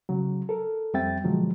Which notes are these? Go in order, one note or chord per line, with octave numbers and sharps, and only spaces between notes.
C#3 F#3
A4 A#4
F2 G3 C4 E5 G5 A6
B2 D3 F3 F#3 G#3